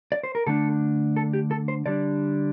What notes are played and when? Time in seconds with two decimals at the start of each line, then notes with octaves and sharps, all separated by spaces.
0.12 D5
0.23 C5
0.35 A#4
0.47 D3 A3 D4 A4
1.16 A4
1.33 G4
1.51 A4
1.68 C5
1.86 D3 G3 D4 D5